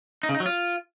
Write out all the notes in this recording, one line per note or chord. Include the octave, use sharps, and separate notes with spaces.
D#4
C#3
D#4
F#3
F4